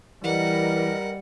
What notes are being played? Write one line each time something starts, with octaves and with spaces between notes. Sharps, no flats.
E3 G3 A#4 B4 D#5 F#5